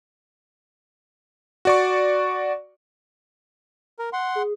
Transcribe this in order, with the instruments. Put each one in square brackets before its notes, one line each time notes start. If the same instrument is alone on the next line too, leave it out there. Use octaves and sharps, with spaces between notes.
[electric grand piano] F#4 D5 C#6
[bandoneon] A#4
F#5 C6
[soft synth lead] G#4